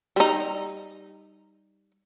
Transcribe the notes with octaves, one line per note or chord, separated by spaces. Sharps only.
G3 D#4